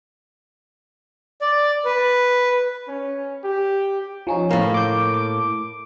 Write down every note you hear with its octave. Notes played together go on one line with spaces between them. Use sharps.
D5
B4
C#4
G4
F3 C#4 D#4
A2 A#3
D6 G6
D6